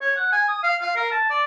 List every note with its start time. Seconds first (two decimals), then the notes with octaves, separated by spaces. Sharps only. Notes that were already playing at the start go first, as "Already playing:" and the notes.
0.01 C#5
0.16 F#5
0.32 G#5
0.48 D#6
0.63 F5
0.81 F5
0.96 A#4
1.11 A5
1.30 D5